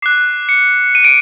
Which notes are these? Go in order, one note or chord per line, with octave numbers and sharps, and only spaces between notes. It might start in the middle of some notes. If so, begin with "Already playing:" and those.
D6 F#6 C7
C#7
D#7
D7